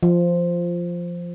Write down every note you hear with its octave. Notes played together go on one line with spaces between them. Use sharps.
F3